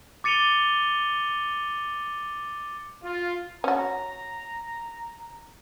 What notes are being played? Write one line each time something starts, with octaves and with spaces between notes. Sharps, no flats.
D6 A6 C#7 D#7 F7 G7
F4
C#4 F#4 A#5